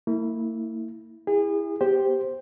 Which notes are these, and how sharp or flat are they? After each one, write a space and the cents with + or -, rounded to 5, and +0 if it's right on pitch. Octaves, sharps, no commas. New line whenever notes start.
A#3 -40 E4 -15
E4 +0 G#4 -35
B3 +0 G4 +0 C5 +0